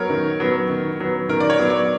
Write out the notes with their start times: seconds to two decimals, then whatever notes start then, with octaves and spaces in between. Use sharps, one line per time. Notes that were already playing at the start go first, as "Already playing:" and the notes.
Already playing: F#3 B3 A#4 C#5
0.10 D#3
0.40 F#3 B3
0.70 D#3
1.00 F#3 B3
1.29 D#3 A#4
1.40 D5
1.50 C#5
1.59 F#3 B3
1.70 D5